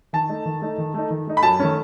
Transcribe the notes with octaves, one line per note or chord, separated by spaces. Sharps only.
D#3 A5
A3 D#4
D#3
A3 D#4
D#3
A3 D#4
D#3
A3 D#4
B5
F#2 A5
D#3 A3 C#4